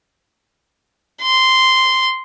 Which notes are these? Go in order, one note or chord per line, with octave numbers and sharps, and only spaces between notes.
C6